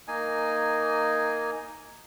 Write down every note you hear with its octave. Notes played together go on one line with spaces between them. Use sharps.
A#3 D#4 G#5